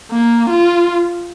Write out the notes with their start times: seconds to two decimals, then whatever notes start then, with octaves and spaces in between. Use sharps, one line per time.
0.11 A#3
0.50 F4